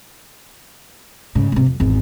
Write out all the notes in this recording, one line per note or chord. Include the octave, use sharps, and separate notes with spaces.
G#2 C#3
G#2 C3
F2
G#1 E2